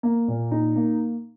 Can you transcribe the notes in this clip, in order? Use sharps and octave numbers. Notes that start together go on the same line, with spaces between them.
A#3
A#2
D#4
A#3